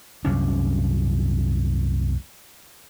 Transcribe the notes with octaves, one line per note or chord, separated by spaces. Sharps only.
C2 F#2 C#4 D4